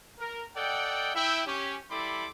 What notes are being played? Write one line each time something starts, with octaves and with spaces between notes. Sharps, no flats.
A#4
A4 D5 D#5 F#5 G5
E4 E5 G5
C#4 G4
G3 E4 A4 B5 C6 D6